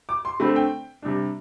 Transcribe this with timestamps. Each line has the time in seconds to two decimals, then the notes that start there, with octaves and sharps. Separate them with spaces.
0.09 D6
0.25 C6
0.40 D3 A3 C4 B5
0.56 G5
1.03 C3 G3 D4